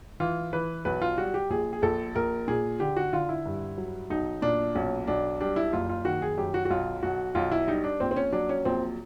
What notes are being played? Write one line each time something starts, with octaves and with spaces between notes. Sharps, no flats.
E3 F4
E3 B4
B1 B4
F4
G3 F#4
G4
A#1 G#4
G#4
A#1 A4
A#1 A#4
A#2 G#4
D3 G4
F#4
D3 F4
E4
G2
F#3
B1 D#4
A#2 D4
B1 C#4
B1 D4
G3 D4
E4
F#1 F4
F4
D#3 F#4
G#4
F#2 G4
F#4
F#4
B1 F4
B1 F#4
B1 F4
E4
G3 D#4
D4
A#1 C4
C4
C#4
F#3 D4
C#4
A#1 C4